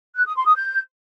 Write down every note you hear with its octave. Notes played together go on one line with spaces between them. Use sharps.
F#6
D#6
C6
D#6
G6